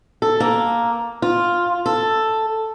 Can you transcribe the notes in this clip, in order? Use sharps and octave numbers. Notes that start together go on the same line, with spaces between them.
A4
A#3
F4
A4